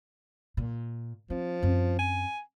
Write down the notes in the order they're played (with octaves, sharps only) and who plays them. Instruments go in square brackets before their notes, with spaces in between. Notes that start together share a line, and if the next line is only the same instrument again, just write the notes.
[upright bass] A#2
[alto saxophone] F3 [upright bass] C4
[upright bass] F#2 C4
[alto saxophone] G#5